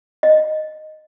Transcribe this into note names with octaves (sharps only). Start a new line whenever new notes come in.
D#5